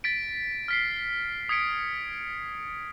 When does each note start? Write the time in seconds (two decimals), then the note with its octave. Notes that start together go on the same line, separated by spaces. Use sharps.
0.04 A6 B6 D7
0.68 F6 B6 C7
1.49 D#6 G#6 B6 C#7 D7